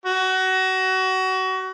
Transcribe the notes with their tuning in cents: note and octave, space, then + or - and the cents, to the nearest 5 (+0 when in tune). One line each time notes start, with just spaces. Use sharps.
F#4 +25